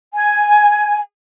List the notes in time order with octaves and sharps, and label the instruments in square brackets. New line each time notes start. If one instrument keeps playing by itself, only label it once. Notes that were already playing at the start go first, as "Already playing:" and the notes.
[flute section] G#5